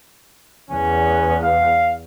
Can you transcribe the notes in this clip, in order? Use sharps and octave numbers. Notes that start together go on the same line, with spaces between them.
E2 B3 C#4
F5